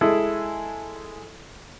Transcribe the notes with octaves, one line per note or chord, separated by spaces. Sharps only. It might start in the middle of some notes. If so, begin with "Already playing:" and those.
G#3 E4 G#4 A4